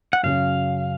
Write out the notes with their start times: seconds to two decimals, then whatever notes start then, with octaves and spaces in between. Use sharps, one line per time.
0.13 F#5
0.23 F#2 C#3 F#3 F5